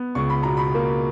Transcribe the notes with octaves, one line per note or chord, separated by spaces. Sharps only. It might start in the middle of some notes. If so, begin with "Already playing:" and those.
Already playing: B3
C#2 C#6
B5
B2 A#5
B5
A#3